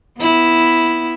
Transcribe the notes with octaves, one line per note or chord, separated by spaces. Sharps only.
B3 E4